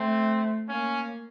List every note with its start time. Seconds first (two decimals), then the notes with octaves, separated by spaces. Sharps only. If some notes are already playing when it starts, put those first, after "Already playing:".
Already playing: A3 C4
0.69 A#3 C#4